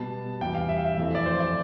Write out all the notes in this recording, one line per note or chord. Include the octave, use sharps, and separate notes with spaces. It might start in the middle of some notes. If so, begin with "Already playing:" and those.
Already playing: B2 G3 B3 A5
E2 C3 G3 G5
F5
E5
F5
E5
F2 E3 A3 C4
D5
C5
D5